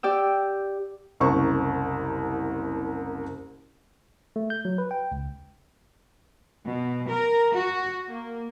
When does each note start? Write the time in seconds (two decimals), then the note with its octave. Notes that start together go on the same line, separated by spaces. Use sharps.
0.03 G4 D5 G5 E6
1.20 F#1 C2 C5 C#6
4.36 A3
4.50 G6
4.65 F#3
4.78 B4
4.91 G5
5.12 C#2
6.64 B2
7.09 A#4
7.53 F#4
8.09 A#3